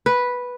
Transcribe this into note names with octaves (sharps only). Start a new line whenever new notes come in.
B4